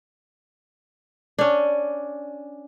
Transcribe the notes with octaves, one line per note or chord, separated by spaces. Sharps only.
C#4 D4